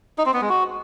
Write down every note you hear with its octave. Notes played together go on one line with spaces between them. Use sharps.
D#4
C4
B3
G#3
F#4